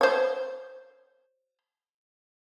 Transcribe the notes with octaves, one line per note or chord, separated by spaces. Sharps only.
C5 C#5